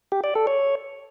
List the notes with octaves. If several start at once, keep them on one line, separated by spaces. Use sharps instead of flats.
G4
D5
A4
C#5